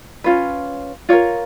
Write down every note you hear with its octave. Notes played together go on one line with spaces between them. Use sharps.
C#4 F4 B4
F4 A#4 C#5